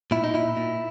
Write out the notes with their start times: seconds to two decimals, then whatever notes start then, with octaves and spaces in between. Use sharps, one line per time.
0.11 A#2 E4
0.24 D#4
0.34 A#2 E4
0.57 A#2